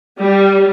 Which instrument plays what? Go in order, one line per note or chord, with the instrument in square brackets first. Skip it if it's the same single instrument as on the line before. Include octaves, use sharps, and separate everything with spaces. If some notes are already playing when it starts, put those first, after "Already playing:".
[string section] G3